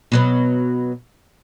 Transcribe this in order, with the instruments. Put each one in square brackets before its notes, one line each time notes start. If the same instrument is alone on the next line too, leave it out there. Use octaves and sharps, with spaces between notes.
[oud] B2 F#3 B3